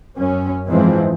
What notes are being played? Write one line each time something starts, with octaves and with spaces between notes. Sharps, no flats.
F#2 C#4
G#2 E3 F3 G#3 C4